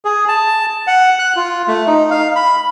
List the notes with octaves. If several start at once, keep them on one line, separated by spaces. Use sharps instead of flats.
G#4
A5
F#5
F#6
F4
A3
D#4
F5
B5